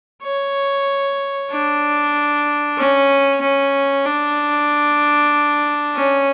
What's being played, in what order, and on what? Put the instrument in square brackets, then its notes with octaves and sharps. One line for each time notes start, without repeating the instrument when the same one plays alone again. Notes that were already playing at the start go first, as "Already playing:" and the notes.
[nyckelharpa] C#5
D4
C#4
C#4
D4
C#4